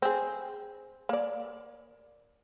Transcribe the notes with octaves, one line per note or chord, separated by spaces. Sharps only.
C4 G#4
A#3 D5